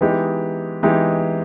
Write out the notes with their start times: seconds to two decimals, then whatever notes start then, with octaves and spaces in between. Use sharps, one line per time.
0.01 E3 G#3 B3 D#4 G4
0.83 E3 G#3 B3 D#4 G4